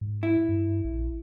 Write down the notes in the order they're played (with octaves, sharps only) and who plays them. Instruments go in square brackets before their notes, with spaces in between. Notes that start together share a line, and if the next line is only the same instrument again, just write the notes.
[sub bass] G#2
[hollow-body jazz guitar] E4
[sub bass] G2
A#1